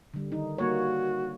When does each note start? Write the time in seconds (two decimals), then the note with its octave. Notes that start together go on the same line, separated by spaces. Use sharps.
0.14 D3 G3
0.32 D#3 D#4
0.58 G3 A#3 F#4 C#5